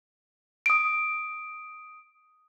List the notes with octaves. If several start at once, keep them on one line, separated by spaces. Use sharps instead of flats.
D#6 D7